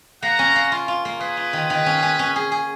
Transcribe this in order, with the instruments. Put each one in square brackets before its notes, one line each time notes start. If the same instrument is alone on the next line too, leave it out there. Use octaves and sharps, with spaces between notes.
[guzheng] A#3 [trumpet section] F#5 A#5
[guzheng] C#4
A#3
F4
F4
A#3
[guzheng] A#3 [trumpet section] G#4 B4
[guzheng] F4
D#3
D#3
C#4
C#4
C#4
G#4
G#4